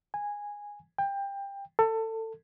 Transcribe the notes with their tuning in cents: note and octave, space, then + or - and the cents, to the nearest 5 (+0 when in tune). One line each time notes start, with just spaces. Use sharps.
G#5 -10
G5 +20
A4 +25